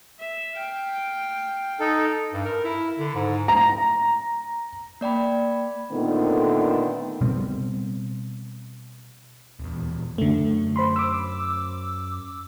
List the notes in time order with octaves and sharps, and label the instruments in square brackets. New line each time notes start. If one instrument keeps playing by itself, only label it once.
[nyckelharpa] E5
F5 G5
[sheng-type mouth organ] D#4 A4
[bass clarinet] G2
A#4
E4
D3
G#2
[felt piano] A#5
[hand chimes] A#3 D5 G5 B5
[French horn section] A#2 D3 D#3 A3 B3 C4
[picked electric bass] B2 G3 C4
D#1 E2
[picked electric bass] F#2 [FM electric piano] D3 A3
[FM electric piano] C5 B5 C6
D6 E6